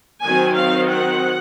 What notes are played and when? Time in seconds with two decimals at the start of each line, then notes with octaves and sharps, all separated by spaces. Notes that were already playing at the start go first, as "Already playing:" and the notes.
0.25 D#3 F#3 C4 G#5
0.57 F5
0.90 F#5